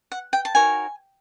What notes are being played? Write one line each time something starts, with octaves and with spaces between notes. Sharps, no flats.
F#5
G5
A5
D#4 F#4 A#4 C#5 G#5